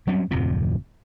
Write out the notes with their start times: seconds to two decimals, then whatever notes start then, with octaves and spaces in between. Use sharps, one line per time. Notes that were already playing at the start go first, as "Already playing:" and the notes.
0.07 F#3 G3 C4 C#4
0.31 D1 F2 C3 F3